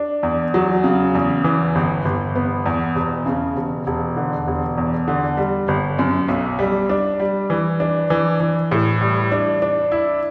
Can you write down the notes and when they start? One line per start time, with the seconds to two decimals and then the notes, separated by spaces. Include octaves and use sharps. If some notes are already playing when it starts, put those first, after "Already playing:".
Already playing: D4
0.23 E2
0.54 F#3
0.84 C#3
1.15 E2
1.44 E3
1.75 G1
2.05 G1
2.35 B3
2.66 E2
2.95 E1
3.26 C#3
3.56 E1
3.87 E1
4.17 D3
4.47 E1
4.78 E2
5.08 D3
5.37 G3
5.68 G1
5.99 F#2
6.28 B1
6.59 G3
6.89 D4
7.20 G3
7.50 E3
7.80 D4
8.10 E3
8.40 E3
8.71 A2
9.01 G3
9.32 D4
9.62 D4
9.92 E4